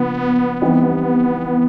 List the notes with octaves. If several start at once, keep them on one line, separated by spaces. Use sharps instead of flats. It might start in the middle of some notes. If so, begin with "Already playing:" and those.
Already playing: C#3 F3 A#3 B3 D4
E3 G3 C4 D#4 G4